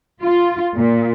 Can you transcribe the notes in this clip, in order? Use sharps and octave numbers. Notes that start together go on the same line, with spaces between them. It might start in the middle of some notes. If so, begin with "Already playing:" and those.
F4
A#2